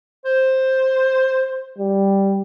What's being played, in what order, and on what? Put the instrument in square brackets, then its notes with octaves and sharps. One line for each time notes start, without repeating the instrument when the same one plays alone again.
[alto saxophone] C5
[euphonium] G3